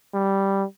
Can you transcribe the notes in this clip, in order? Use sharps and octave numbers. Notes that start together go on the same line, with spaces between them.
G3